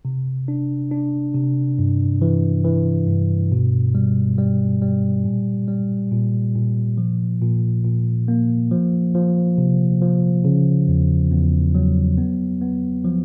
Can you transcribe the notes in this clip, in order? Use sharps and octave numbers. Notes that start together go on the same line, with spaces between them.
C3
D4
D4
C3
G2
E3
E3
G2
B2
G3
G3
G3
A#2
G3
A#2
A#2
F3
A#2
A#2
A#3
F3
F3
C3
F3
C#3
E2
E2
F#3
B3
B3
F3